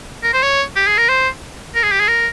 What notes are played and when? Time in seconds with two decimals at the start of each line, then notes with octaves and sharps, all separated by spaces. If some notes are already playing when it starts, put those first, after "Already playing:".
0.23 A#4
0.33 C5
0.43 C#5
0.76 G4
0.87 G#4
0.98 A#4
1.09 C5
1.75 A#4
1.83 G#4
1.91 G4
2.00 G#4
2.08 A#4